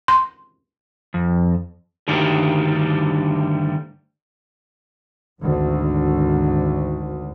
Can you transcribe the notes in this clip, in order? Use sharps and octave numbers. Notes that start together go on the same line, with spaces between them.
C6
F2
D2 G2 D3 D#3 G3 A#3
G#1 D2